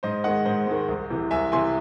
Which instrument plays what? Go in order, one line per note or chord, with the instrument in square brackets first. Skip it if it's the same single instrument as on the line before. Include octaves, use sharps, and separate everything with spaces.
[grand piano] G#2 C5 D#5
D#3 G#3 D#5 F#5
G#2 C5
D#3 G#3
C2
C3 E3
C2 E5 G#5
C3 E3 G#5 C6